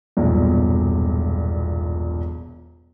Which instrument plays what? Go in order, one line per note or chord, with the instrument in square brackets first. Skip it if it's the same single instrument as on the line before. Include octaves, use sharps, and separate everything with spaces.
[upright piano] E1 B1 G2 A#2